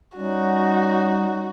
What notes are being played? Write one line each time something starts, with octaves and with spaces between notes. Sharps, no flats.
G3 C#4 D#4 F#4